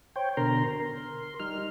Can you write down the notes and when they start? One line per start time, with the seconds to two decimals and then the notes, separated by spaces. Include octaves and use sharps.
0.16 C5 C#5 G5
0.37 B2 D3 A#4 A#5 C6
0.80 A#4 C6
1.40 G3 D#4 F6